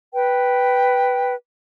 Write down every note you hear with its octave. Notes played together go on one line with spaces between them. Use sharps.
B4 G5